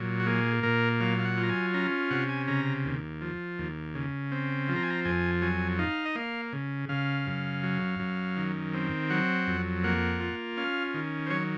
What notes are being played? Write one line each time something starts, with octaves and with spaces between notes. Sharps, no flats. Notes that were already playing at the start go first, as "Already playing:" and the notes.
Already playing: A#2 F#3
F#4
A#3 G#4
A#2 A#4
F#3 F5
F5
F#5
F4
A#5
G#5
C#4 A#5
C3 F#5
G#5
C#3 A#5
D#2
F3
D#2
C#3
C4
F3
A#5
G#5
A#5
F2 G#5
F#3 G#5
D#4 F5
D#5
A#3 F5
C#3
C#3 F5
F#2
F#3
F#2
D#3
C4
F#3 F#5
F2
A#3 F#5
F4
C#4 F5
D#3
C5
F#3 C#5